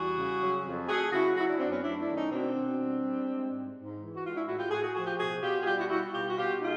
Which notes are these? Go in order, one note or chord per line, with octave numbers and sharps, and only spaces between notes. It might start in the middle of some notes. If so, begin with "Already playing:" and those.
Already playing: E2 G3 F#4 G#4
C#3
F#3
F2
A3 F#4 G#4
C#3 E4 F#4
F#3 E4 F#4
D4 E4
F#2 C4 D4
B3 C#4
A3 D4 E4
D4 E4
D#3
C#4 D#4
B2 C4 D4
B2
G3
G3
G#3
G#2
G#2
E3
F#4
G#3 F4
D4 E4
A2 E4 F#4
F4 G4
A2 F#4 G#4
F#4 G#4
F3 F#4 G#4
F4 G4
B2 F#4 G#4
B2 F4 G4
G#4
G3 F4 G4
E4 F#4
G3 E4 F#4
B2 F4 G4
F#4
B2 F4 G4
G#3 D#4 F4